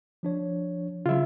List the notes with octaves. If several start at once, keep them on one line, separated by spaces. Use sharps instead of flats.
F3 D4 C#5
C#3 F#3 F4 E5